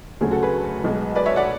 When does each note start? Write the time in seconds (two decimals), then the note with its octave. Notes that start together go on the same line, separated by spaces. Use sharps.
0.21 D2 C#3 F#3 A3 G#4
0.31 F#4 A4
0.42 G#4 B4
0.84 B1 B2 G#3
1.16 B4 D5
1.26 C#5 E5
1.36 D5 F#5